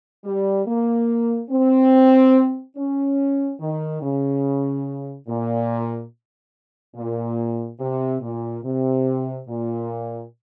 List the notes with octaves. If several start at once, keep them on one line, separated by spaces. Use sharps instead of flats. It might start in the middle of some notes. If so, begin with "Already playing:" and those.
G3
A#3
C4
C#4
D#3
C#3
A#2
A#2
C3
A#2
C3
A#2